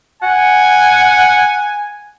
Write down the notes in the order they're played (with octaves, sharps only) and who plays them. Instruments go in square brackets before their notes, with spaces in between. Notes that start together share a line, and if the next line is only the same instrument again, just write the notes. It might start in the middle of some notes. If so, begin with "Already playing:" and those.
[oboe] F#5 [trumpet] G#5